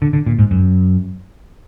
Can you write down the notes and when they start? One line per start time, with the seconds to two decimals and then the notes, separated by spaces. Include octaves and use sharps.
0.02 D3
0.13 D3
0.26 A#2
0.39 G#2
0.51 F#2